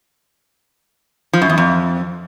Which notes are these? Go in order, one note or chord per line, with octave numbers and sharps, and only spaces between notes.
F3
F#2
E2
F2